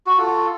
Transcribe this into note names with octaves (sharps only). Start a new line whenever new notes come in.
F#4
F4 A4